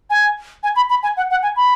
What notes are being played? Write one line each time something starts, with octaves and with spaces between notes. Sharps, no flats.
G#5
G#5
B5
B5
G#5
F#5
F#5
G#5
B5